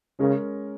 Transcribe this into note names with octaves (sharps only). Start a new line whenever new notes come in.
C#3 G#3 C#4 A#4